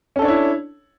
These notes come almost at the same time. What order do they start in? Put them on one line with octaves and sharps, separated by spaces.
C#4 A4 D4 C#5 E4